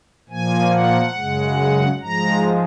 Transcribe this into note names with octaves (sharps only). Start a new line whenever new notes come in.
A#2 F3 A#3 G#5
F#5
F#2 C#3 G#3
G#2 F3 G#3 A#5